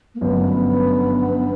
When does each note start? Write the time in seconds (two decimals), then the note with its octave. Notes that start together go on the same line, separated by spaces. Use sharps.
0.15 A#3
0.21 G1 F#2 D3 F3 A3 B3